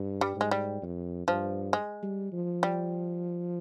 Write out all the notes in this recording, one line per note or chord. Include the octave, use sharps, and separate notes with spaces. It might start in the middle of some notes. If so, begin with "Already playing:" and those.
Already playing: G2
G3
G#2 G#3
G3
F2
G2 F3
G#3
G3
F3
G3